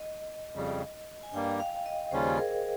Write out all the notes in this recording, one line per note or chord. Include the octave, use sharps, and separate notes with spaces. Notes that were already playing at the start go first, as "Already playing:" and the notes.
Already playing: D#5
F2 C#3 G3
G#5
G2 G3 A#3 G5
F5
D#5
D#2 C#3 G3 C#4 F4 C5
G#4
A#4